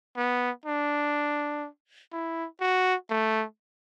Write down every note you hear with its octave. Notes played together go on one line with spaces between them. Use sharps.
B3
D4
E4
F#4
A3